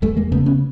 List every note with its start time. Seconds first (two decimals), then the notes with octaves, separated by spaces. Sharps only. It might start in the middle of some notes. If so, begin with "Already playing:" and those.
0.02 E2 G3 A3
0.17 G#3 A#3
0.32 C#3 A3 B3
0.46 B3 C#4